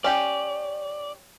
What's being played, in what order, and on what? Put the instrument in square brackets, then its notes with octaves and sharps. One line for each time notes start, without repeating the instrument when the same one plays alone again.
[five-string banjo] C#4 G4 [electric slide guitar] D5